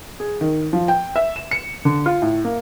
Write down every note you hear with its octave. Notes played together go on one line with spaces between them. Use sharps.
G#4
D#3
F3
G5
E5
E7
C#7
D3
F4
A2
A#3